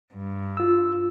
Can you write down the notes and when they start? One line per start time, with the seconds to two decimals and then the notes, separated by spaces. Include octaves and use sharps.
0.13 G2
0.57 F4 E6